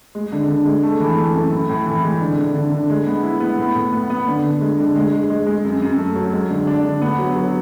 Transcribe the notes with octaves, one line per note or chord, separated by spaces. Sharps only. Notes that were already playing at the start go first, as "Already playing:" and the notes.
G#3
D3
D3
G#3
A3
E3
A3
F#2
A2
A2
E3
G#3
D3
D3
D3
D3
G#3
B3
E4
B3
A2
A2
B3
B3
D3
D3
G#3
D3
G#3
G#3
G#3
G#3
F#2
F#2
A3
F#3
G#3
D3
D4
D3
B3
F#3
F#3